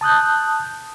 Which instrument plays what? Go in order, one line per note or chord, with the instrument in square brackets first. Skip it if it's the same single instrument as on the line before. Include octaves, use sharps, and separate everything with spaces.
[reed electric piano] A5 D#6 F#6 G6